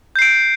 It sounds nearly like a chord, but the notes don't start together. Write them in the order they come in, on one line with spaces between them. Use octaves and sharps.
G6 C7 D7